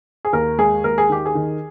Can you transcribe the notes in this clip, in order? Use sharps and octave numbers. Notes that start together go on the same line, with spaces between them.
G#4
D#2 A#4
G#3 G#4
D#2 A#4
G#4
D#3 G4
G#4
D#3